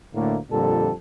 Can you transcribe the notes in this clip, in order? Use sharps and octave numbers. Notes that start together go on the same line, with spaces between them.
D2 A2 D3 A3 A#3
F2 A#2 D3 G3 A4